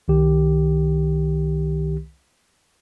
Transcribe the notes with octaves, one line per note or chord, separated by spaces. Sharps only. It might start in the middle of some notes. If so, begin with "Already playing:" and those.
C2 D#3 G4